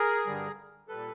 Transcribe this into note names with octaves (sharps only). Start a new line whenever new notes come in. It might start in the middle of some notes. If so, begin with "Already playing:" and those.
Already playing: G#4 A#4
G2 D3 G3
A#2 G3 A4 B4